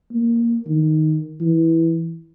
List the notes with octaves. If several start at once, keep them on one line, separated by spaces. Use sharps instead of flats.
A#3
D#3
E3